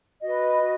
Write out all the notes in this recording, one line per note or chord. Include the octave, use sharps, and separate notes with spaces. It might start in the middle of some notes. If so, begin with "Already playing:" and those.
F#4 B4 D#5
F#4